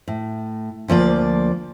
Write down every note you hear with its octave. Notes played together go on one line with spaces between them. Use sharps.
A2
D2 F3 A#3 D5